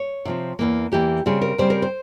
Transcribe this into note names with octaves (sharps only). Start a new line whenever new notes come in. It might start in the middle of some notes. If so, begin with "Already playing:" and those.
Already playing: C#5
C3 F3 C4
E2 E3 A#3
E2 E3 A#3 G4
C#3 G3 C4 G#4
A#4
C#3 G3 C4 C5
A#4
C5